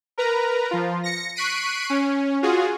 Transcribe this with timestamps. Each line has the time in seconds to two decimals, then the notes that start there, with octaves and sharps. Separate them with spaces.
0.18 A#4 B4 A#5
0.71 F3 F4
1.03 A#6 C#7
1.36 C#6 F#6 B6 C7 D7 D#7
1.90 C#4
2.42 F4 F#4 G#4